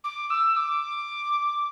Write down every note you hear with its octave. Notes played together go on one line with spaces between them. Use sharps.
D6
E6
D6